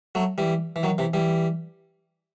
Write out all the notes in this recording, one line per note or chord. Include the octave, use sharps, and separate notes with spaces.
F#3 A3
E3 G3
E3
D#3 F#3
C3 E3
E3 G3